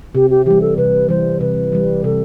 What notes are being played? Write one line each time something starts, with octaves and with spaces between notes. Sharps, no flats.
C3 G4
G4
E3 G3 G4
A4
C3 B4
E3 G3 C5
C3 B4
E3 G3
C3 A4